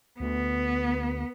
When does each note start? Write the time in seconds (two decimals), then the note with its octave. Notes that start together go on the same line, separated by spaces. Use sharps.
0.20 D2 B3